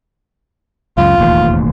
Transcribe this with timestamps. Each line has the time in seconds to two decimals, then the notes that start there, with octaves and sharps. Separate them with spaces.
0.98 C#2 F#2 F4
1.18 E1 A1 D#2